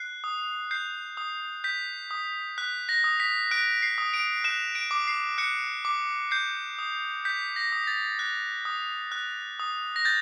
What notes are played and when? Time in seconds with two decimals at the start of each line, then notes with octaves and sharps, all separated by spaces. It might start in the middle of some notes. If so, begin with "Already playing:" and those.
Already playing: F#6 C7
0.24 D#6
0.71 G6 C7
1.17 D#6
1.64 G6 B6
2.11 D#6
2.58 F#6 B6
2.89 A#6
3.04 D#6
3.20 B6
3.51 F#6 D7
3.82 C7
3.98 D#6
4.14 D7
4.44 F#6 E7
4.75 D7
4.91 D6
5.08 C7
5.38 F#6 C#7
5.85 D6
6.31 G6 C7
6.79 D#6
7.25 G6 B6
7.56 A#6
7.72 D#6
7.87 A6
8.19 F#6
8.65 D#6
9.12 F#6
9.60 D#6
9.96 A#6
10.05 G6 A6